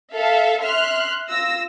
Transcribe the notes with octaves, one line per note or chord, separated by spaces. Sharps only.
A4 E5 F5
E5 C6 F6 F#6
F4 E6 A#6